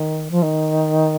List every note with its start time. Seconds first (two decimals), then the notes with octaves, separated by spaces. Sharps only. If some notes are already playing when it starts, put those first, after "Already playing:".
Already playing: D#3
0.31 F3
0.42 D#3